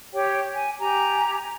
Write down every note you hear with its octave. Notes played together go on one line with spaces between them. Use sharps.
G4 C#5 G5
G#5
G4 G#5 A#5